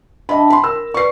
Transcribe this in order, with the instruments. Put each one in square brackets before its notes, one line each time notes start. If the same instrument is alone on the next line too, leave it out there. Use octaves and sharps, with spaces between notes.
[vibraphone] D4 G5 A5 [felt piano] D#5 E5 B5
[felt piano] B5 C6
[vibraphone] A#4 [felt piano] E6
[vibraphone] B4 D5 [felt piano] C#6 C7